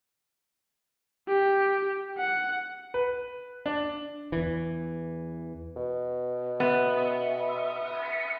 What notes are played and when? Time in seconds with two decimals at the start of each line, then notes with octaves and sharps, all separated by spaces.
1.28 G4
2.18 F#5
2.94 B4
3.66 D4
4.32 E2 E3
5.76 B2
6.60 B3 E5